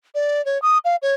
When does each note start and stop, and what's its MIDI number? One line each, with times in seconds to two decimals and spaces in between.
0.15 0.44 74
0.45 0.60 73
0.62 0.78 87
0.85 0.96 77
1.02 1.15 73